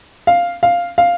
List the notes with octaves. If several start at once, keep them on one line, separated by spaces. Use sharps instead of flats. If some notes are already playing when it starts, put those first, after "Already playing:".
F5
F5
F5